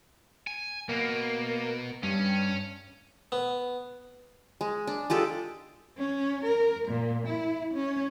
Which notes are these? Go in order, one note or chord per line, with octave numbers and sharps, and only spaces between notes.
G#5
B2 A#3
G2 C#4
B3
G#3
D4
G#3 F4 G4 A4
C#4
A#4
A#2
E4
C#4